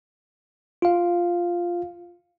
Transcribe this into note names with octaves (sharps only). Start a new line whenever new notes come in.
F4 F5